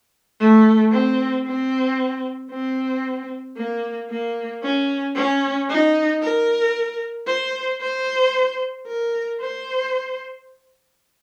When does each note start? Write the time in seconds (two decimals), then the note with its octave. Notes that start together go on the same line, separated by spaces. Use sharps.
0.40 A3
0.92 C4
1.46 C4
2.51 C4
3.57 A#3
4.10 A#3
4.63 C#4
5.15 C#4
5.69 D#4
6.22 A#4
7.27 C5
7.80 C5
8.87 A#4
9.40 C5